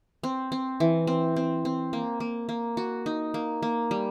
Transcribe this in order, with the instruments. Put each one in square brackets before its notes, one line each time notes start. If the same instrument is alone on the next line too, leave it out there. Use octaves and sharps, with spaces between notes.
[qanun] C4
C4
E3
C4
C4
C4
A#3
A#3
A#3
F#4
D#4
A#3
A#3
G3